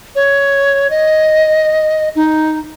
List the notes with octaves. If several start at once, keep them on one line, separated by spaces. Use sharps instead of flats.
C#5
D#5
D#4